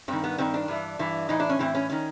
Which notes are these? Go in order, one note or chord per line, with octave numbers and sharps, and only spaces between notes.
G2 D#3 C4
B3
G2 D#3 C4
D4
G2 E3
G2 E3
A2 E3 D#4
D4
C#4
A2 E3 C4
C#4
D#3 C#4